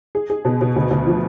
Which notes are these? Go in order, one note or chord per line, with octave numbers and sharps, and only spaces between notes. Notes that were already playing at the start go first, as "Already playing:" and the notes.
G#4
G#4
B2
B2
D2
D2
F3